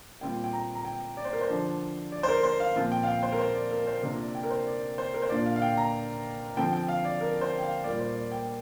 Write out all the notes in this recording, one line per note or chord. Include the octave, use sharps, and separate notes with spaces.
A#2 G3 C4 F4 G5
G5
A#5
A#5
G5
D5
C5
A#4
C5
D3 F3 D4
D5
C5
A#4
C5
F5
A#2 F3 C4 F4
G5
F5
G5
C5
A#4
C5
D5
A#4
C5
C3 A#3 D4 F4 A#4
D5
G5
A#4
C5
D5
C5
A#4
C5
A#2 A#3 D4 F4 D5
F5
F5
G5
A#5
D3 F3 C4 G5
G5
F5
D5
A#4
C5
G5
F5
A#2 G3 A#3 F4 D5
C5
D5
G5